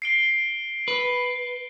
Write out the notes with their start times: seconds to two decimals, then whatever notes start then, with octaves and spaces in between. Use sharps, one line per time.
0.02 C7 D7 G7
0.88 B4